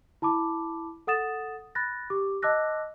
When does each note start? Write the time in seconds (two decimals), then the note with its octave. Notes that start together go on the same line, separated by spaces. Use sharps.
0.22 E4 A5 B5 D6
1.07 A4 F#5 D#6 A6 E7
1.75 B5 F#6 A6 A#6
2.10 G4 D6
2.42 D#5 A5 D6 E6 F#6 A#6